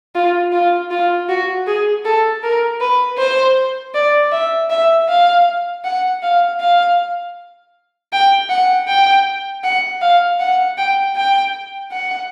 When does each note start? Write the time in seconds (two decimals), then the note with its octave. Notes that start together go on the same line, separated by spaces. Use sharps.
0.15 F4
0.53 F4
0.91 F4
1.29 F#4
1.67 G#4
2.05 A4
2.43 A#4
2.81 B4
3.18 C5
3.95 D5
4.32 E5
4.70 E5
5.09 F5
5.84 F#5
6.22 F5
6.60 F5
8.12 G5
8.50 F#5
8.88 G5
9.64 F#5
10.02 F5
10.40 F#5
10.78 G5
11.16 G5
11.92 F#5